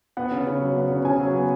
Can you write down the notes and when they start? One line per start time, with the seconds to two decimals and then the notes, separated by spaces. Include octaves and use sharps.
0.17 B3 F#5
0.32 C#3
0.47 C#3
0.61 F#3
0.76 B3
0.90 C#3
1.05 C#3 G#5
1.20 F#3
1.34 B3